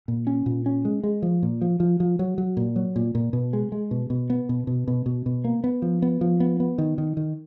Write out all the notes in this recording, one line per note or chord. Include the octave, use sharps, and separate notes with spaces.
A#2
C#4
A#2
C#4
G#3
G#3
F3
A#2
F3
F3
F3
F#3
F#3
A#2
F#3
A#2
A#2
B2
G#3
G#3
B2
B2
B3
B2
B2
B2
B2
B2
A#3
B3
F3
B3
F3
B3
B3
D#3
D#3
D#3